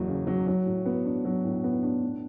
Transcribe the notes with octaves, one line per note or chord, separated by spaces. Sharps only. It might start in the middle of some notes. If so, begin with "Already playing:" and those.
Already playing: F#1 E2 F#3
C#3
F#3
F#3
A2
B3
D4
F#3
A2
B3
D4
A2